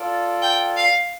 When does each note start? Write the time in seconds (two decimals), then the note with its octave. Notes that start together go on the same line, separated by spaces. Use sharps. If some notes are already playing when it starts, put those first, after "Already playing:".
Already playing: F4 A4 D5
0.42 G5
0.77 F5